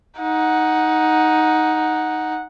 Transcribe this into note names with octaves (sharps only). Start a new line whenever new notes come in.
D#4 F#5